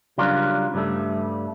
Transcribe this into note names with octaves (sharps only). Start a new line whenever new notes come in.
C#3 F#3 G3 D4 F4 A#4
G2 C#3 G3 A3